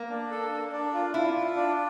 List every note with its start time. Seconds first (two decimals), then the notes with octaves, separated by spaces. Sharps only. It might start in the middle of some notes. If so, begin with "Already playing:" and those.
Already playing: A#3
0.09 D4
0.31 A4
0.51 D4
0.72 D4
0.94 F4
1.14 E4 F4
1.35 F4
1.56 D4